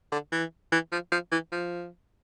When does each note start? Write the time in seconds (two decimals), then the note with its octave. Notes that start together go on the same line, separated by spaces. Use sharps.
0.12 D3
0.32 E3
0.72 E3
0.92 F3
1.12 F3
1.31 E3
1.52 F3